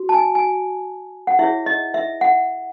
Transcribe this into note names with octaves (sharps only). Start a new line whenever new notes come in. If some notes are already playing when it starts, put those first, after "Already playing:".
Already playing: F#4
A5
G#5
G#5
F#5
E4 G#4 C#5 E5
D#5
E5
F#5